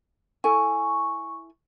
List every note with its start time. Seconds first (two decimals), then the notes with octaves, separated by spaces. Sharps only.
0.44 E4 A4 G#5 C#6